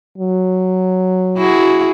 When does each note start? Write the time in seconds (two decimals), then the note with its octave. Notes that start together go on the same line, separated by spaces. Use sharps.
0.18 F#3
1.37 E4 F#4 G#4